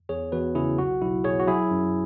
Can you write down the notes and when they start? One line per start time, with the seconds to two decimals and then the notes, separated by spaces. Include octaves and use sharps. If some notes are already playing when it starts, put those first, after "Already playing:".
0.09 E2 G#4 C#5
0.32 E2 F#4 B4
0.55 C#3 E4 G#4
0.78 B1 F#4
1.01 B1 E4
1.24 B2 G#4 C#5
1.40 F#4
1.47 F#3 E4 G#4
1.71 F#2